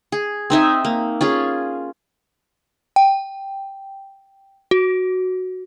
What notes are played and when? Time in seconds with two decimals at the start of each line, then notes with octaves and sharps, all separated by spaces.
0.12 G#4
0.50 C4 D#4 E5 G#5
0.85 A#3
1.21 C#4 F4 G#4
2.96 G5
4.71 F#4